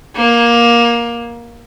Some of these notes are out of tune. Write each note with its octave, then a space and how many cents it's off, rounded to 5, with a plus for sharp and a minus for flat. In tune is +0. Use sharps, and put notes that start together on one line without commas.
A#3 +15